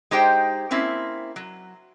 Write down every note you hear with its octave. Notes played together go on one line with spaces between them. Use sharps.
G#3 D#4 G4 C5 G5
A#3 C4 C#4 E4
F#3